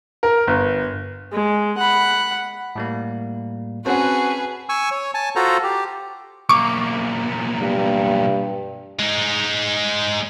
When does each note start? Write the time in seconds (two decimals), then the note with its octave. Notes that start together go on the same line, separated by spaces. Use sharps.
0.23 A#4
0.47 G1
1.32 G#3
1.78 F#5 B5
2.76 A2 G3 A#3
3.86 C4 C#4 F#4 G#4 B4 F#5 A5
4.69 G#5 C#6 E6
4.91 C#5
5.14 G#5 A5
5.36 F4 F#4 A4 C5 A#5
5.63 G4
6.49 B1 A#3 C#6 D6
7.60 G2
8.99 G#3 D#4